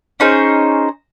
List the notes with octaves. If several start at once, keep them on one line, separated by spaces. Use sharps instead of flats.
C#4 D#4 G#4 C5